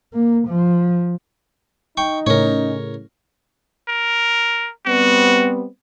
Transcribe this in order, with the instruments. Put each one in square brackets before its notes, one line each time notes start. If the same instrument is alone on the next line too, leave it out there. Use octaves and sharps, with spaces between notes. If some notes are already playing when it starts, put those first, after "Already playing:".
[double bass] A#3
F3
[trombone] D#4 [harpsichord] G5 C#6
[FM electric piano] A2 C#3 [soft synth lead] C#4 [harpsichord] A#4 C#5
[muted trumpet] A#4
[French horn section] G3 B3 C4 [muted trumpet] F#4